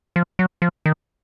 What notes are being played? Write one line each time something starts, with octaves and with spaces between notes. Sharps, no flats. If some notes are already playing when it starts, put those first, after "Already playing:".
F3
F#3
F3
D#3